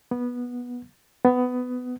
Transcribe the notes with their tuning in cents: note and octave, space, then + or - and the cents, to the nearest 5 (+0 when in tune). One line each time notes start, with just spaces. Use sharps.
B3 -10
B3 +20